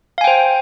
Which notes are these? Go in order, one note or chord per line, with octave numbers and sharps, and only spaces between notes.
C5 F5 G5 G#5